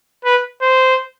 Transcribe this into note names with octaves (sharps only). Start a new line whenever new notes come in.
B4
C5